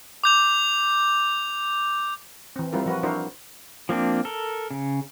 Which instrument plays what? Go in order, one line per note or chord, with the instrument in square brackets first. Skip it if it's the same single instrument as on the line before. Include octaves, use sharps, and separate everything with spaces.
[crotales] D6 G6 F7
[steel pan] E3 C4
G3 C4 E4 F4 A#4
F3 F#4 B4
D4 E4 F#4 A#4 C5
[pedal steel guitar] F3 A#3 C4 D4
A4 A#4
C#3